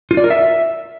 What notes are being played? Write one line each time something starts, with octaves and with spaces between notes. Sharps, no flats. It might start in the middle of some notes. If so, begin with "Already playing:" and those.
F4
D5
A#4
E5